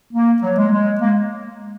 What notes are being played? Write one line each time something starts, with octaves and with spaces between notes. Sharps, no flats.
A#3
F#3
G#3
G#3
A#3